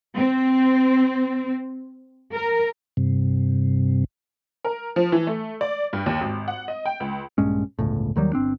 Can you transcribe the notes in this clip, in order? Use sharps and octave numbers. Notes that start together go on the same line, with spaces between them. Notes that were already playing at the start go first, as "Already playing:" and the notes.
C4
A#4
G2 C3
A#4
F3
E3
A3
D5
G2
D#2
G#1
F#5
D#5
G5
C#2
A#1 G2 G#3 C#4
G1 C#2 A2
D#2 D#3 F#3 G3
G1 C4 D4